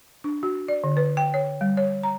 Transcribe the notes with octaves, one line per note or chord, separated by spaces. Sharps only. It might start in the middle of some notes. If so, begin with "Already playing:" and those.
D4
F#4
D5
D3
B4
G5
C#5
G3
C#5
A#5